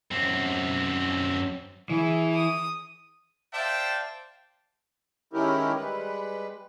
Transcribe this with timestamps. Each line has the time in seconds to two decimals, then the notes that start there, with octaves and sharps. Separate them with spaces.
0.11 F#2 C4
1.90 E3 E4 G#4
2.35 D#6
3.53 C5 D5 E5 F5 G5 A5
5.33 D#3 G#3 C#4 E4 G4 A#4
5.77 G3 G#3 B4